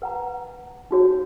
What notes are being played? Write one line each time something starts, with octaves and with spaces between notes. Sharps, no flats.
B4 F#5 A#5
D#4 F#4 C#5